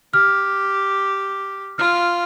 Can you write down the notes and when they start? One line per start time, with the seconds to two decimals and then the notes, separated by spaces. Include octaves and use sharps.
0.13 G4 F6
1.78 F4 F6